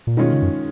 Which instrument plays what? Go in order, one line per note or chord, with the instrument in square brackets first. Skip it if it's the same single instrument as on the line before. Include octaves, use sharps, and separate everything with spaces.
[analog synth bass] A#2
[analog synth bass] B2 [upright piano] D#3 G#3 C#4 F4
[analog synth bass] C#3
F#2